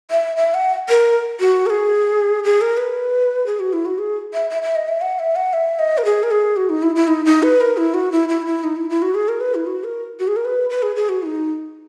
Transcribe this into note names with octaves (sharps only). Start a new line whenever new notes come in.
E5
E5
F#5
A#4
F#4
A#4
G#4
G#4
A#4
B4
G#4
F#4
E4
F#4
G#4
E5
E5
E5
D#5
E5
F#5
E5
F#5
E5
D#5
A#4
G#4
A#4
G#4
F#4
D#4
E4
E4
D#4
D#4
B4
A#4
E4
F#4
E4
E4
E4
D#4
E4
E4
F#4
G#4
A#4
B4
E4
F#4
A#4
F#4
G#4
A#4
B4
B4
G#4
G#4
F#4
E4
D#4